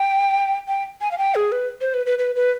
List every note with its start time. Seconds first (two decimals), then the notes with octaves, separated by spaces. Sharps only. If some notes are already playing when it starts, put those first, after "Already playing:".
Already playing: G5
0.68 G5
1.01 G#5
1.11 F5
1.18 G5
1.35 G#4
1.52 B4
1.81 C5
1.94 B4
2.06 B4
2.19 B4
2.36 B4